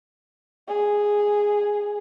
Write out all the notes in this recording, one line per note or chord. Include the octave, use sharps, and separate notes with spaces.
G#4